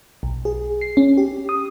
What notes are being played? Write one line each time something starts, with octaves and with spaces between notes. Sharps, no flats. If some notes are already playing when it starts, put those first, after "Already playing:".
B1
G#4
C7
C#4
G4
D#6